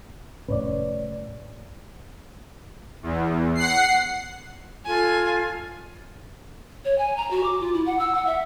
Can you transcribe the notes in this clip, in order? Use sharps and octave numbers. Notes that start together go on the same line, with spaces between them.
F1 A2 C#4 B4 C#5 D5
E2
F#5 C7
F4 A4 G#5
C#5
G#5
A#5
F#4
D6
F4
E4
F#5
E6
F#5
E5